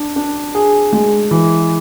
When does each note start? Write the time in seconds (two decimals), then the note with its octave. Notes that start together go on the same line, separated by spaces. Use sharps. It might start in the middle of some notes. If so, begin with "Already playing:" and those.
Already playing: D4
0.16 D4
0.55 G#4
0.93 G#3
1.31 E3